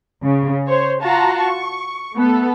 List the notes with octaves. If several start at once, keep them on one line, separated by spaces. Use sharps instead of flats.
C#3
C5 C#5
F4 F#4 A5 A#5
C#6
A3 B3 A4